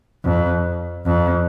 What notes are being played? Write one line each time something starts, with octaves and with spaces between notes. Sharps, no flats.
F2
F2